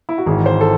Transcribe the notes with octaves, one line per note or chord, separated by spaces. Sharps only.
E4
F#4
G#1 G#2 E3 G#4
C5
A4